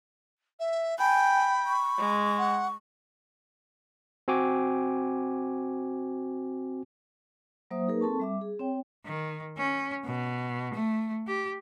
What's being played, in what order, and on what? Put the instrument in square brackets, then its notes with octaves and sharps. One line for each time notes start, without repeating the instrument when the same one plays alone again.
[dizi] E5
[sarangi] G5 [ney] G#5 [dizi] B5
[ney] C#6
[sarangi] G#3
[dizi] F#5
[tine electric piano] C4 F#4 G#5 D6
[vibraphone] F#3 A#3 C5 E5 D#6
A#3 D#4 G#4 A#4 B4
C4 A4 A5 C#6
G3 E5 D6
G#4
C4 C#5 G5
[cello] D#3
C#4
B2
A3
G4